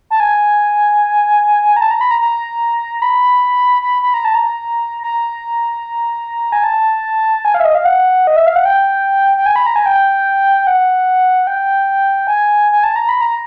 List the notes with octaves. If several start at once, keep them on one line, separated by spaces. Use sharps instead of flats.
A5
G#5
A#5
A5
A#5
B5
A#5
A#5
B5
B5
B5
A#5
A5
A#5
A#5
G#5
A5
G#5
F5
E5
D#5
F5
F#5
D#5
E5
F5
F#5
G5
G5
G#5
B5
A#5
G#5
G5
F#5
G5
G#5
G#5
A5
A#5
B5
A#5